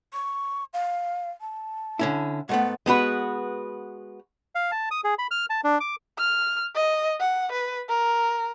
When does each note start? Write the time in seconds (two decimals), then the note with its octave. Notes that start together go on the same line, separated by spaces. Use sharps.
0.13 C#6
0.74 F5
1.41 A5
1.99 D3 C#4 E4
2.49 G#2 A3 B3 F#5
2.86 G#3 B3 F#4 B4
4.55 F5
4.71 A5
4.91 D#6
5.04 G#4
5.18 B5
5.31 F6
5.50 A5
5.64 D4
5.80 D6
6.18 F6
6.75 D#5
7.20 F#5
7.52 B4
7.89 A#4